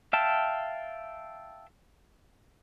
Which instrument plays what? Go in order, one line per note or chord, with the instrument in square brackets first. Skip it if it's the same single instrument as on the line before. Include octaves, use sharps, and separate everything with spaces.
[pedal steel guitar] E5 F5 G5 A5